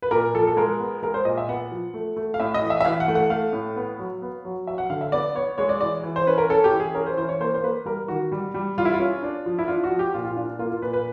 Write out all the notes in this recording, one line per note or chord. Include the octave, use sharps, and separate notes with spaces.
B4
A#2 A#4
F3 A4
A4
G#3 A#4
B3
G#3 A#4
C5
A#2 D#5
E5
B3 F#5
F3
A3
A3
F5
A2 E5
D#5
E3
E5
E5
E3 F5
F#5
A3
F#5
A3 F5
A2
B3
F#3
B3
F#3
F#3 E5
F#5
D3 F5
E5
B3 D5
B3 C#5
G#3 C#5
D5
E3 D5
E3
C5
C#4 B4
A#4
C#4 A4
G4
E3
G#4
C#4 A#4
C5
E3 C5
C#5
A#3 C5
C5
A#3 B4
G3 A#4
D#3 F#4
G3
G3
G3 F4
E4
F4
C#4
D4
F3
E4
D4 F4
F#4
F3
G4
A#2 F4
F4
D4 F4
A#3 F4
F4
A#2 B4
B4